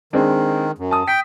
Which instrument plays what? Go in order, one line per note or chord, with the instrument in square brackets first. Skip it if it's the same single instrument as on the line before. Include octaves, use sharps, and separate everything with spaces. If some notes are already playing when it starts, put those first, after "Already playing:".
[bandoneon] D#3 [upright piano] G#3 C4 D4
[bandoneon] F#2
[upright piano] A5 D#6
[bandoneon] G5 [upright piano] B6